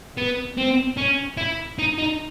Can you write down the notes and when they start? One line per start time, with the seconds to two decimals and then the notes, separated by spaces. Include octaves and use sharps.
0.17 B3
0.58 C4
0.98 C#4
1.38 E4
1.79 D#4
1.98 D#4